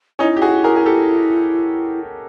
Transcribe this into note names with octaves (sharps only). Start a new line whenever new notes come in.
C#4 D#4 E4
G4
F#4 G#4
G#4 A#4
G#4
G4 A4